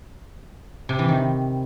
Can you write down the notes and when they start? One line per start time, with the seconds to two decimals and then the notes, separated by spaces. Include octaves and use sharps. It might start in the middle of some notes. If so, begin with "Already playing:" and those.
0.89 C3
0.99 E3
1.09 D#3